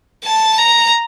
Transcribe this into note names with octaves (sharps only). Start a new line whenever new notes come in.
A5
A#5